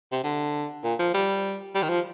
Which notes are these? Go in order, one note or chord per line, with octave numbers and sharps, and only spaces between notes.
C3
D3
A#2
F3
G3
G3
D#3
F3